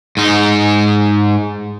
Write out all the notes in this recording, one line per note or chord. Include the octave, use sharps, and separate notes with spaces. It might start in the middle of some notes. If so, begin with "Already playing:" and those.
G#2 D#4